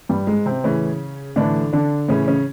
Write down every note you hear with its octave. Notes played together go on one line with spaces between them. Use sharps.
G2 G3
G#2 G#3
C3 C4
A2 C#3 E3 C#4
A2 D3 E3 D4
D3 D4
A2 C#3 E3 C#4
C#3 C#4